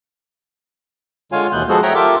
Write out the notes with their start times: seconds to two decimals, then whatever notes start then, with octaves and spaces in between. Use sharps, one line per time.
1.32 D3 G#3 F4 C#5 F5 G#5
1.52 D#2 B2 E3 B3 F#6 G6
1.69 F3 G#3 B3 F#4 G#4 A4
1.82 C#5 E5 F#5 G5 A#5
1.95 F4 G4 A4 A#4 E5 D6